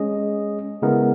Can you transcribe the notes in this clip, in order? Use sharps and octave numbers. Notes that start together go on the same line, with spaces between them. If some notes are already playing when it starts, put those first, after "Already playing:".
Already playing: G#3 C#4 G#4 D#5
C#3 G#3 B3 E4 A#4